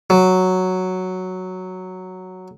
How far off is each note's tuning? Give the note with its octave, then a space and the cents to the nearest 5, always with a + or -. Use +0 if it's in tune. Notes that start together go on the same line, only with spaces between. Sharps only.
F#3 +0